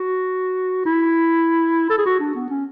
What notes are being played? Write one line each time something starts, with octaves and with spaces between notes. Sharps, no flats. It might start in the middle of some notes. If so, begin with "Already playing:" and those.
Already playing: F#4
E4
A4
G#4
F#4
D4
B3
C#4